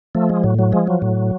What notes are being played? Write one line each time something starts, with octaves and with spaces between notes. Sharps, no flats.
F3 A3
G#3
A2 F#3
F#3
F3 G#3
F#3
A2